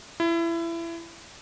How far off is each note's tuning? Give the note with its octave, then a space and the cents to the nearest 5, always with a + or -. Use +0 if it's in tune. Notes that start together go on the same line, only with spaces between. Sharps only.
E4 +25